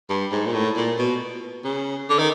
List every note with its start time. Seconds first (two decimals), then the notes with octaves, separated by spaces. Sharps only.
0.10 G2
0.32 G#2
0.46 A#2
0.54 A2
0.76 A#2
0.98 B2
1.65 C#3
2.09 D3
2.19 D#3